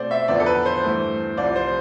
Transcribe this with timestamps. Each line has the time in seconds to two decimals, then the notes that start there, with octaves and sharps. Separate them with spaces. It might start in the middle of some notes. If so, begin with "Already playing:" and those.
Already playing: B2 A3 C4 C5 D5
0.11 E5
0.28 E2 D3 F3 B3 D5
0.40 A4
0.46 B4
0.66 C5
0.84 G2 E3 A3
1.37 C2 C3 F3 D5
1.56 C5